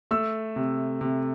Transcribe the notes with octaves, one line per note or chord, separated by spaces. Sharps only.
A3 E6
C3
C3